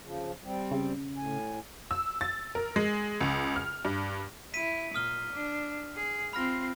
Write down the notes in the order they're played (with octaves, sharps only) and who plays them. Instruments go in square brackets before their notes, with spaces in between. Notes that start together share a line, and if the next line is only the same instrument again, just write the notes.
[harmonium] C#3 F3
G3 C4
[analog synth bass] C#3
[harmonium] A2 G#5
[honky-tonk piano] E6
A6
A#4
G#3
C#2
F6
G2
[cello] E4 [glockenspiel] B6 D#7
[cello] A#2 [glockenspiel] D#6 F6 G7
[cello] D4
G#4
[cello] C4 F4 [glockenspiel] B5 F6 A#6